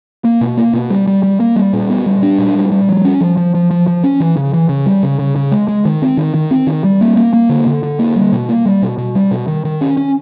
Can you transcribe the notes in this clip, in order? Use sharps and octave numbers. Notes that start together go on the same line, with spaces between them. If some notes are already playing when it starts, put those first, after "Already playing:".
A#3
B2
A#3
B2
G3
G3
G3
A#3
G3
A#2
B3
G3
D4
A#2
G3
G3
F3
C#4
F3
F3
F3
F3
F3
C#4
E3
C#3
E3
C#3
G3
C#3
C#3
C#3
G#3
G#3
D#3
C4
D#3
D#3
C4
D#3
G3
A#3
A#3
A#3
D3
D3
D3
A#3
G3
B2
A#3
G3
B2
B2
G3
B2
D#3
D#3
C#4
C#4